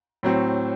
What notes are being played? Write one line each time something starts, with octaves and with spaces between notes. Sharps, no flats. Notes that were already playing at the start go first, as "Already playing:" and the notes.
A2 F#3 C4